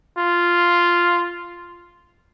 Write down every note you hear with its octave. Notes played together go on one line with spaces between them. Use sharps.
F4